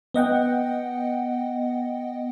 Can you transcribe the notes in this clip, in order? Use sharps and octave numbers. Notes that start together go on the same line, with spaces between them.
B3 D#5 F#5 G5